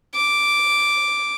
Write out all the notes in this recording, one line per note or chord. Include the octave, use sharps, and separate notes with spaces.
D6